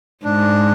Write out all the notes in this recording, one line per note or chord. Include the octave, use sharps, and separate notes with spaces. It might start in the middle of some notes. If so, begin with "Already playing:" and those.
G#2 D4